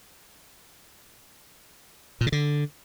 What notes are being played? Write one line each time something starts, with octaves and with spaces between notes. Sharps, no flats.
A#2
C#3
D3